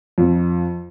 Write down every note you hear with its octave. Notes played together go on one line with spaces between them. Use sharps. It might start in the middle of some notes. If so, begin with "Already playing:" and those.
F2